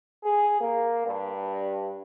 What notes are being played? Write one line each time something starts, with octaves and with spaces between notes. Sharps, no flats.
G#4
A#3
G2